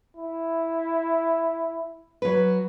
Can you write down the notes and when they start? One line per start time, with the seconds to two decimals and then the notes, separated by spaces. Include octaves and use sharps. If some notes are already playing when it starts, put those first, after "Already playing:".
0.16 E4
2.22 F#3 B4